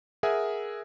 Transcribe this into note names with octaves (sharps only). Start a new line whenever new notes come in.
G#4 A#4 E5 F#5 G#5